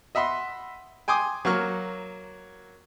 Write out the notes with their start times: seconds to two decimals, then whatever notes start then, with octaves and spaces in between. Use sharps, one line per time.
0.15 D#5 E5 F#5 B5 C6
1.08 G5 G#5 C6 D6 D#6
1.45 F#3 A#3 C#6 F6